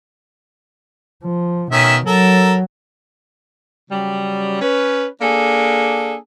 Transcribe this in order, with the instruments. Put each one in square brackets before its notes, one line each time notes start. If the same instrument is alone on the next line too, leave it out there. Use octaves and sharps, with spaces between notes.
[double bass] F3
[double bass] B2 [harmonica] D#3 C#4 E5
[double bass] F#3 [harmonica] A4 A#4
[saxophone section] C#3 F#3 G3
C#4 B4
A#3 D4 G#4 A4